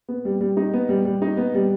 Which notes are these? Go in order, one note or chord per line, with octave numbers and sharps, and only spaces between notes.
B3
G3
G3
D#4
B3
G3
G3
D#4
B3
G3